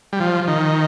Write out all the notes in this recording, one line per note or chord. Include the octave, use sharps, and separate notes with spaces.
G3
F3
D#3